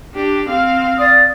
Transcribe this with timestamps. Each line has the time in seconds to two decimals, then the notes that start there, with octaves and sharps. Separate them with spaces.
0.15 D4 G4
0.49 C4 F5
0.99 D5 D#6